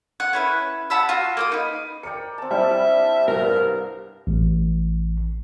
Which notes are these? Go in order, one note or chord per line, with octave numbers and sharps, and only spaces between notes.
F#5
C#4 E4 B4
F#5 A5 B5 E6
F4 F#4
A#3 G5 D#6
D#4 B4
A#4 D5 G5 C#7
C4 A5
G3 D4 E4 E5
C2 G2 A#4 F5
A1